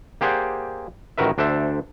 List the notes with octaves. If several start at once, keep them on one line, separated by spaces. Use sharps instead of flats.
A#3 G4 G#4 C5 D5 F#5
A1 D#3 F#4 A#4 B4 E5
D2 D4 A4 C5 E5